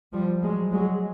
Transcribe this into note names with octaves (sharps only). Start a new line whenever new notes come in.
F3 G3
F#3 G#3
F#3 G#3